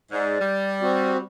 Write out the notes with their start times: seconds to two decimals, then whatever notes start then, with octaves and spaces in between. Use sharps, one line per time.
0.12 G#2 D5
0.40 G3
0.82 C4 F#4